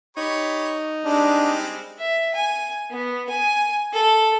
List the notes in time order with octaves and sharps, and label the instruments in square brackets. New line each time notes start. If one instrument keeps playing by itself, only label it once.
[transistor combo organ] D#4 [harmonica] G4 C#5 B5
[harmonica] G3 G#3 C4 [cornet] D4
[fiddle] E5
G#5
B3
G#5
A4